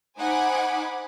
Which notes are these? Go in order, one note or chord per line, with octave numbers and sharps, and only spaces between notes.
D#4 C5 F#5 G#5 B5 D6